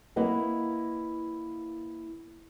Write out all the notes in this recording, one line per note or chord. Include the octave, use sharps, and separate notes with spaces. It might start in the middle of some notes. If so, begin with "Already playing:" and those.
A#3 E4 B4 D#5 F#5